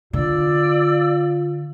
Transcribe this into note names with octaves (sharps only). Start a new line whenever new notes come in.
D3 F4 D5 E6